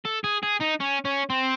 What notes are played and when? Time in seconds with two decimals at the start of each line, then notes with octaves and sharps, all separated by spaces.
0.05 A4
0.24 G#4
0.43 G#4
0.61 D#4
0.81 C#4
1.05 C#4
1.30 C4